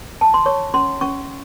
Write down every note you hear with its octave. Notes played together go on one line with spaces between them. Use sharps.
A5
C6
C#5 C#6
C#4 C6
C#4 C#6